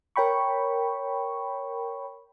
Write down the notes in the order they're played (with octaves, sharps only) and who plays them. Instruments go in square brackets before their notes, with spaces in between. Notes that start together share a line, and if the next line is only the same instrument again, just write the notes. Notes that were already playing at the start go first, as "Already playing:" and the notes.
[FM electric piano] A#4 C#5 G5 B5 C#6